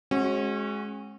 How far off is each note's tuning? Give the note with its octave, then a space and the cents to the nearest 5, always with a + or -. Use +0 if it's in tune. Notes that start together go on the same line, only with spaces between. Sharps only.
G#3 +15 C#4 -35 F#4 +0